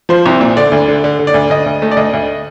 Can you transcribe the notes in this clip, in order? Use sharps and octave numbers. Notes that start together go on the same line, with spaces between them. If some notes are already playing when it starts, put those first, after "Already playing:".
F3 C5
C2
A#2
D3 D5
D2
D3
D3
D3
D5
D2
D2 D#5
D2
A3
D5
D2 D#5
D2